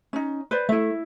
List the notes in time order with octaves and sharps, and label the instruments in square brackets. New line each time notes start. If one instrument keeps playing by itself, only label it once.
[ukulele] C#4 D#4
B4 C5 D5
[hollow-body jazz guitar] A3 [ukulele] E4 E5